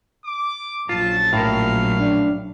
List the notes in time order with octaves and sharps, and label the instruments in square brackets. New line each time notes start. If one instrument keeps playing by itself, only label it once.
[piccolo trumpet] D6
[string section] A#1 C#3 F#3 [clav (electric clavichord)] F4 [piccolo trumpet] A5
[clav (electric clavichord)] A2 A#4 [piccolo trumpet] F5
[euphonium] D4